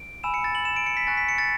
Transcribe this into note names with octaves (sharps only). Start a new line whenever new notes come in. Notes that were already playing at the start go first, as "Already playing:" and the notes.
Already playing: D7
G#5 B5 E6 E7
C#7
A6
F#7
E7
D7
C#7
B6
G#5 C#6 F#6 A6
B6
C#7
A6